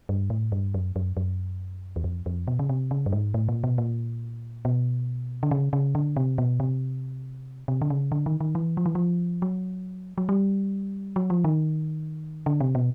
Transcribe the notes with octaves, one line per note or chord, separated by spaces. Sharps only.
G2
A2
G2
F#2
F#2
F#2
E2
F2
F2
B2
C#3
C3
C#3
G2
G#2
A2
A#2
B2
A#2
B2
D3
C#3
C#3
D3
C3
B2
C3
C3
D3
C#3
D3
D#3
D#3
E3
F3
E3
F3
F#3
F#3
G3
F#3
F3
D#3
D3
C3
B2